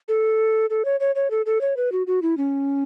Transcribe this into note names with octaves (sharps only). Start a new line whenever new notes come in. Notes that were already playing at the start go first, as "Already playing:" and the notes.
A4
A4
C#5
C#5
C#5
A4
A4
C#5
B4
F#4
F#4
E4
C#4